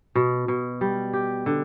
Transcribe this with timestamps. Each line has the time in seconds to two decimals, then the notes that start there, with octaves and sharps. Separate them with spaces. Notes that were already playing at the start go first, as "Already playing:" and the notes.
0.15 B2
0.48 B2
0.81 G3
1.13 G4
1.46 D3